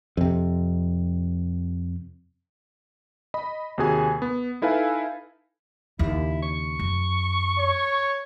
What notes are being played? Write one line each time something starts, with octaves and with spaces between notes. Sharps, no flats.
F2 C3
D#5 B5
D#2 C3 F#4 G#4 G#5
B3
D#4 E4 A4 B4 F5 G#5
D#2 C#3 E4
C#6
F#2
C#5